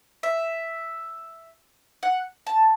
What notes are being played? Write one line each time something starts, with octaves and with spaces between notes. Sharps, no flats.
E5
F#5
A5